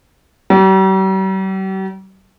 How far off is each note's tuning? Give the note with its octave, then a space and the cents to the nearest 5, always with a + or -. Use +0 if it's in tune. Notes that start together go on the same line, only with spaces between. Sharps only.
G3 -45